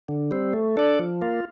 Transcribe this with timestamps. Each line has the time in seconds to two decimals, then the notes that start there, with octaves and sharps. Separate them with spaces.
0.08 D3
0.31 G3 C4
0.53 A3
0.77 D4 A4 D5
0.99 F3
1.21 A#3 F4